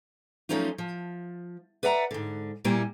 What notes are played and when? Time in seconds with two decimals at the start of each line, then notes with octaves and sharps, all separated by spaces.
0.49 F3 F#3 A3 C#4 D#4 F4
0.78 F3
1.83 B4 D5 E5 F#5 A#5
2.11 G#2 D3
2.65 A#2 G3 A#3 E4 G#5